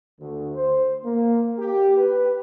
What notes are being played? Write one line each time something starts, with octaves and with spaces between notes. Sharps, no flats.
D2
C5
A#3
G4
B4